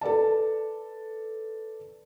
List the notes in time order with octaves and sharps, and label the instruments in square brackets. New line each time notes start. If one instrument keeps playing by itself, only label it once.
[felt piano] A4 B4 D5 A5